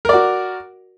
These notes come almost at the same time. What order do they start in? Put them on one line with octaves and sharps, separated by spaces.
A#4 D5 F#4